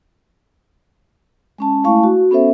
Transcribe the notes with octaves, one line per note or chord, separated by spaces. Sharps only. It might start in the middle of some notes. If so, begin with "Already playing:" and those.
G#3 C#4 A5
G#3 A3 E4 F5 A5 C#6
F#4
B3 C#4 A4 C5 E5